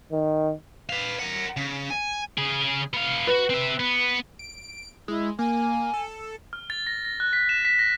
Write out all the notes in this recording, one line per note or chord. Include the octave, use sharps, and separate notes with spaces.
D#3
B4 F5
A#4 F#5
C#3
G#5
C#3 G#4
B3 F5
F4 F#4 B4
C4 E5
B3
D7
G#3 E4
A#3 G#5
A4
F6
A6
A#6
A#6
F#6
B6
E7
B6
A#6